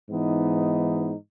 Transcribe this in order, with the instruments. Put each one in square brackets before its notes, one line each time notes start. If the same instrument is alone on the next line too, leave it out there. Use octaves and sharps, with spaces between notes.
[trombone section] G#2 E3 B3 D#4